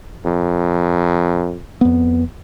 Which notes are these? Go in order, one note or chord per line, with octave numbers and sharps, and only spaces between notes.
F2
F2 B3